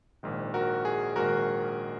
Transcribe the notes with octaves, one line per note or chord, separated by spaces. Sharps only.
A#1 G#2 D#3
F#4 A#4
G#4
A#1 G#2 D#3 F#4 A#4